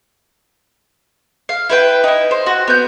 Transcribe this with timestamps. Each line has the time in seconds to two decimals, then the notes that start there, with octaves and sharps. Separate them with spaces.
1.49 F5
1.69 E4 B4 G5
2.04 D#4 E4
2.31 C5
2.46 F#4
2.68 B3 G6